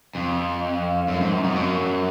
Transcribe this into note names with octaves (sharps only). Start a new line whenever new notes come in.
F2
F#2
G#2
F#2
F2
F#2